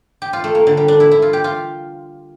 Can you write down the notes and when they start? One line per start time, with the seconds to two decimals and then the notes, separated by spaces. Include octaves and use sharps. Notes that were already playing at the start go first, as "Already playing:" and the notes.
0.22 G4
0.33 F4
0.44 A3
0.55 A#3
0.67 D3
0.77 G3
0.88 D4
1.00 E4
1.11 E4
1.22 F4
1.33 G4
1.44 F4